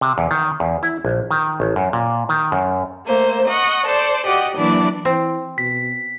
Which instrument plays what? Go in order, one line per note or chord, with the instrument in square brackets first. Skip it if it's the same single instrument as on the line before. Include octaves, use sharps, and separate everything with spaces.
[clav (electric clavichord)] C3
E2
D#3
E2
E4
A#1
D#3
A1
F#2
A#2
D#3
F#2
[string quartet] A3 A#3 C5
D#5 F#5 C#6
A4 C5 D5
F#4 G4 D5 D#5 F#5
E3 F#3 A#3 D4 E4 D5
[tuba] E3 [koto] C4
[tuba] B2 [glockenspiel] B6